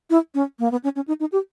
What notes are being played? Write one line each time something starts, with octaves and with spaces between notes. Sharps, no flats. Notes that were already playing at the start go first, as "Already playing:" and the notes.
E4
C#4
A#3
B3
C#4
C#4
D#4
D#4
G4